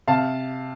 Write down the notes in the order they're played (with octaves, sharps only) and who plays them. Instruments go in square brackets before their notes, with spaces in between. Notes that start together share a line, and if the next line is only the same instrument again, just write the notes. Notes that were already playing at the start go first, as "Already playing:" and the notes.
[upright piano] C3 F5 A5